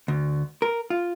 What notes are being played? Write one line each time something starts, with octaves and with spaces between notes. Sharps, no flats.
D2
A#4
F4